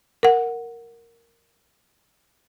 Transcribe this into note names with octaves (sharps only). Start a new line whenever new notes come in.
A#4 F#5